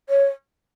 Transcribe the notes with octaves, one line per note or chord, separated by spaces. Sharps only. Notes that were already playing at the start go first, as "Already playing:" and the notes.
C#5